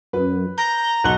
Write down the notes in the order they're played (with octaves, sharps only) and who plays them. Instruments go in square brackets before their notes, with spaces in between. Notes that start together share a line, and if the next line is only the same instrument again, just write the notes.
[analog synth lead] F#2 [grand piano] B4
[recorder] A#5 [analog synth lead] G6
[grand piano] B1 F#6 G7 [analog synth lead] F#5